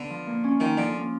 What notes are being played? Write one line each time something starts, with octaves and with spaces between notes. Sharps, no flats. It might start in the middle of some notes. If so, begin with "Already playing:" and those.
Already playing: D3 B3
F3
A#3
C#4
D#3 F3
D3 F3
A#3